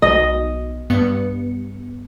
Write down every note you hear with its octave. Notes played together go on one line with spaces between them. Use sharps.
B1 D#5
G2 B3 C#7